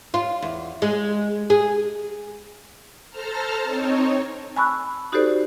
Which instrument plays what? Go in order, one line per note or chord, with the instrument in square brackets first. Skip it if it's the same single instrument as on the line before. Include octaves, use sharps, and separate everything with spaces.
[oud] F4
E2
G#3
G#4
[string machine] A4 C5 A5 A#5 F6
C4 D#4 C#5
[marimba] G#5 A5 B5 C#6 E6 F#6
D#4 F#4 G4 A4 C5 D5